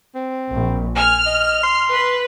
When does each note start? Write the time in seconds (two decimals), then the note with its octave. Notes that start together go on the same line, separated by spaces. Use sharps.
0.15 C4
0.51 A#1
0.97 G#5 F6
1.26 D#5
1.63 C6
1.92 B4